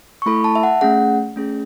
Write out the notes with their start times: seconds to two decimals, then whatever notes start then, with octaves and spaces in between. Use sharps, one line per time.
0.22 C#6
0.26 A3 E4 A4 B5
0.44 A5
0.55 E5
0.63 F#5
0.81 A3 C#4 G#4 F#5
1.36 A3 C#4 G#4